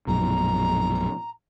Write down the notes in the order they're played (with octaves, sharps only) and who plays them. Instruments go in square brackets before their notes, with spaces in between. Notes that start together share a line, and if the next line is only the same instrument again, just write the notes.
[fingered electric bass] A#1 F#2 B2 [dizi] A#5